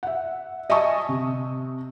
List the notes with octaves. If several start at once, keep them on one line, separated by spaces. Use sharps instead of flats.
E5 F#5
D#5 E5 G#5 A5 C#6 D#6
C3